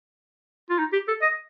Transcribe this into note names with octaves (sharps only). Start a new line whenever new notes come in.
F4
D#4
G4
A4
D#5